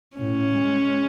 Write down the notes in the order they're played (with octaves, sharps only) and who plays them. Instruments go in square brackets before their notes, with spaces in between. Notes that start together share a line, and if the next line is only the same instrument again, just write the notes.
[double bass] A2 [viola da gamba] C#4
[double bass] G#3